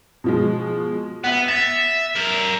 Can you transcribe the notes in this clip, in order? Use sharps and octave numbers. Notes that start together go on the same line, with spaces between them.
B2 F3 G#3
B3 E5 F#5
E5 A6
A#4 E5